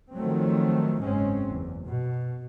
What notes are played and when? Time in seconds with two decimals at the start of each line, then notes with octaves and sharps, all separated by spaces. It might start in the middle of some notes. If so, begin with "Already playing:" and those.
0.15 D#3 F3 F#3 A3 C4
1.03 F#1 G#2 G#3 C4 C#4
1.47 F#1 E2
1.83 B2